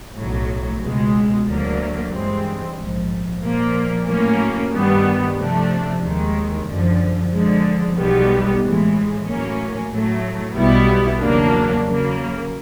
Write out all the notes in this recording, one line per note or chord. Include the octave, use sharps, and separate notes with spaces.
B1 A2 F#3
C#2 B2 G#3
D2 D3 F#3 A#3
G2 E3 G#3 C4
A#1 G#2 F3
A#2 F3 A#3
A2 F#3 A#3 C#4
G2 D#3 G3 B3
C3 F3 A3 D4
D#2 D#3 G#3
F#2 D3 F3
D3 F3 G#3
B1 B2 G3 B3
A2 E3 G#3
A2 F#3 A#3 C#4
A2 F#3 A3
B1 B2 G3 B3 E4
E2 C#3 F#3 A#3 D4
C#3 F#3 A#3